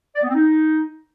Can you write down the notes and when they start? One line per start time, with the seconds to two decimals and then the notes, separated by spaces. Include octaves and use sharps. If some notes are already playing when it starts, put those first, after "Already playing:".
0.16 D5
0.22 B3
0.29 C4
0.35 D#4